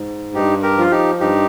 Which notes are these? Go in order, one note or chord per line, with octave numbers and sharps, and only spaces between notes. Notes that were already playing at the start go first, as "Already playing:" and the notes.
Already playing: G#2
G2 D#4 G4
G4 A#4
F3 F4
D#4 G4
G2 D#4 G4